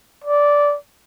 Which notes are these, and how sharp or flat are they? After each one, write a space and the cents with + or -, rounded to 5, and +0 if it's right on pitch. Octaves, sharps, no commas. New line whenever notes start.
D5 -10